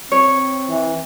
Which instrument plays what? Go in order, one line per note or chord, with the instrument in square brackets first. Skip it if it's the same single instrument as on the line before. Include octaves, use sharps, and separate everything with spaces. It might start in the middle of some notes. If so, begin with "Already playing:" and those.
[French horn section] C4 [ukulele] C#5
[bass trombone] E3